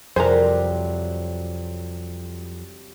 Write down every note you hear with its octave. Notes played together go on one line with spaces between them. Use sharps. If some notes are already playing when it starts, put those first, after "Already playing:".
F2 C3 F#3 G3 G#4 A#4 C5